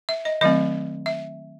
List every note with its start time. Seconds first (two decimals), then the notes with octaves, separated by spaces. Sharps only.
0.09 E5
0.25 D#5
0.41 D#3 F#3 A3 C4 D#5
1.06 E5